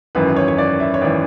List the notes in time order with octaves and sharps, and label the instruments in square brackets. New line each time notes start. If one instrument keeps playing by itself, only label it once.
[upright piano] G#1 F#2 E3 [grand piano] B4
[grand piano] C#5
C#5
D5
E5
C#5
[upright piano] G#1 E3 [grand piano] D5